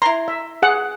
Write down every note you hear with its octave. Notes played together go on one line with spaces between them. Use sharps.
E4 A#5 C6
E5
G#4 F#5